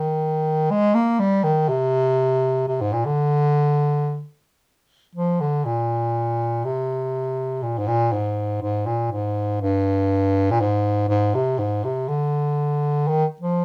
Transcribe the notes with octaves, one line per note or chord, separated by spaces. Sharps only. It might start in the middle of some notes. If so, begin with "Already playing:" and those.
Already playing: D#3
G#3
A#3
G3
D#3
C3
C3
G#2
A#2
D3
F3
D3
A#2
C3
A#2
G#2
A#2
G#2
G#2
A#2
G#2
G2
A#2
G#2
G#2
C3
G#2
C3
D3
D#3
F3